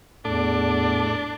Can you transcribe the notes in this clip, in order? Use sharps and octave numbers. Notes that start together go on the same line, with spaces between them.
E2 A2 D4 A4 D6